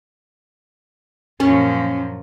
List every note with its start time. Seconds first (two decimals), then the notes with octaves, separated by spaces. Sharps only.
1.40 F#2 A#2 F3 C#4